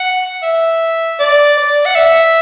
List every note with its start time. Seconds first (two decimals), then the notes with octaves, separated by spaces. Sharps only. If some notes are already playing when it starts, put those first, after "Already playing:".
Already playing: F#5
0.42 E5
1.20 D5
1.57 D5
1.86 F#5
1.95 E5